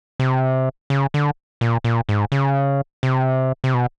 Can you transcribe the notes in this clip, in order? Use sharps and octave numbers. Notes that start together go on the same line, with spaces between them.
C3
C#3
D3
A#2
A#2
G#2
C#3
C3
C3
B2